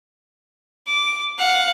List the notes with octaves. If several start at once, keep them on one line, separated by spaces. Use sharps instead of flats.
D6
F5 F#5